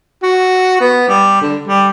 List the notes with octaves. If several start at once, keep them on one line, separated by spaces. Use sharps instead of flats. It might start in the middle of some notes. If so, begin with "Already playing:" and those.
F#4
B3
G3
D3
G3